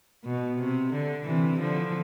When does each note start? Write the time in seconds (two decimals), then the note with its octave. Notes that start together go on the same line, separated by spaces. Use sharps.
0.25 B2
0.58 C3
0.93 D3
1.26 C3 E3
1.59 D3 F3